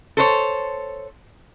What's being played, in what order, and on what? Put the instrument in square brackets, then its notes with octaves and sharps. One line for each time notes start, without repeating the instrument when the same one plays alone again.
[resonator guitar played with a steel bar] A4 C5 C#5